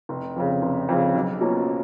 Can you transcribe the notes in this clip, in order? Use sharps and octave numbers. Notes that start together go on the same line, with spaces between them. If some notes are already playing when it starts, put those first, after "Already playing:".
F1
F2 C#3
F1
F2 C#3
B1
B2 A#3 C#4 F4